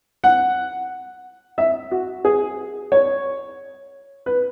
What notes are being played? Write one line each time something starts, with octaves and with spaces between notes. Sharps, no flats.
F#5
E5
F#4
G#4
C#5
B4